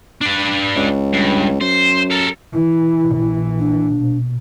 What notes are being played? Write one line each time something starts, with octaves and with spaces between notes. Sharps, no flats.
D4 B4
C#2
G2
F#2 C5
A4 A#4
E3 E4
A#1 E3
D4
B2